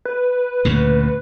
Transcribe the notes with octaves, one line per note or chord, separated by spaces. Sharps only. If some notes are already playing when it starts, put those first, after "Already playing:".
B4
D2 A#2 C#3